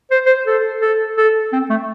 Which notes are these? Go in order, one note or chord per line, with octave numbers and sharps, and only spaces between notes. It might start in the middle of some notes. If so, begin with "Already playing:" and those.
C5
C5
A4
A4
A4
C4
A3